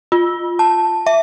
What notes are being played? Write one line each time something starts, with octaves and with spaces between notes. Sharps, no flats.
F4
A5
E5